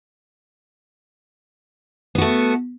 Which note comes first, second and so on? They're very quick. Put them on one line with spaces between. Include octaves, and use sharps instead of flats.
B3 F#4 A3